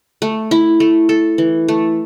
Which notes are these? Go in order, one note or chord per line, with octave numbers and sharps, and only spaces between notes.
A3
E4
A3
A4
E3
A3